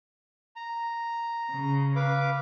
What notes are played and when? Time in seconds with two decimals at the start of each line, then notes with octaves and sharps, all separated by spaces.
0.56 A#5
1.52 C#3
1.96 B4 F5 D6